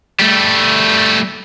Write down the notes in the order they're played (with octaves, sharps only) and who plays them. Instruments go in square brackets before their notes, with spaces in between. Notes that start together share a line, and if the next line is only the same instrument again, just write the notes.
[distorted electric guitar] G3 A3